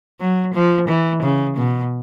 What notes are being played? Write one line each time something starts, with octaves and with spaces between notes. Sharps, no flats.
F#3
F3
E3
C#3
B2